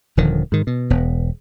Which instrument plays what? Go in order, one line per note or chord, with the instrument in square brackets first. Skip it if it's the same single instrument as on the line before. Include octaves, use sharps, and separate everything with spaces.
[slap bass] D#1 D3 D#3 F3
G#2 D#3
B2
E1 B3